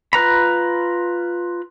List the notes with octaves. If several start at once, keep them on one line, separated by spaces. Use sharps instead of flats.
F4 B4 A#5 B5